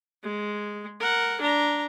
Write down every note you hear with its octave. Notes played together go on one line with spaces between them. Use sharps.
G#3
A#4 F#5
D4 A#5